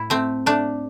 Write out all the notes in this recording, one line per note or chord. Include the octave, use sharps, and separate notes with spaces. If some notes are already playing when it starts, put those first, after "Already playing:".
Already playing: A2 E4
A3 C4
A3 D4